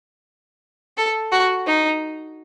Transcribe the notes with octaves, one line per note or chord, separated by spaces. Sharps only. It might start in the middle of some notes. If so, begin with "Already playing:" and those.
A4
F#4
D#4